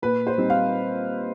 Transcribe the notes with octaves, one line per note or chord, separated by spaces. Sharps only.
A#2 B4
C5
G3 C4 D#4
F5